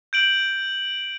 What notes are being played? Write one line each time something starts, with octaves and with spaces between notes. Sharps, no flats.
G6 D7 F#7